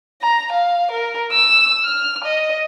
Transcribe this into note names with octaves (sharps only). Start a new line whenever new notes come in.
A#5
F5
A#4
E6
F6
D#5